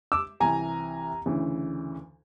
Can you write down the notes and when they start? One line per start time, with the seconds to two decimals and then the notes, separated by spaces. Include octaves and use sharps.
0.12 D6 E6
0.40 C2 C3 E3 G#5 A#5
1.26 D2 C#3 E3